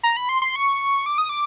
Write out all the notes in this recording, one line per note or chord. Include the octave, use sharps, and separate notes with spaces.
A#5
B5
C6
C6
C#6
D6
D#6
D6